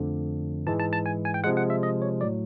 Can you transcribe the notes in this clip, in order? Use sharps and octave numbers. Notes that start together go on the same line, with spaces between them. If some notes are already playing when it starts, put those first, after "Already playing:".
Already playing: F2 D3 F3 A3
G#2 E3 G#3 A5
A5
A5
G#5
G#5
G5
C3 F3 G#3 F#5
F#5
E5
D#5
C#5
A2 F#3 A3 D5